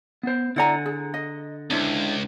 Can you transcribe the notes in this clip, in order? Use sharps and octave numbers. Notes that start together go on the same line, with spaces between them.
B3 C5
D3 E4 D5 F#5 G#5 A#5
G#4
D#5
C#2 D4 E4 C5